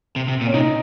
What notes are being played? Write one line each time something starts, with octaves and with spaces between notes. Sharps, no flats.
C3
C3
A#2
C#4
C3 D#4